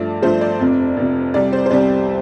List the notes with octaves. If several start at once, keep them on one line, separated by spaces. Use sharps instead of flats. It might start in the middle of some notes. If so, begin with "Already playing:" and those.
Already playing: G2 F3 A3 D5
G2 F3 A3 C5
D5
F1 F2 C3
F1 F2 C3
C2 C3 G3 D5
C5
C5
C2 C3 G3 D5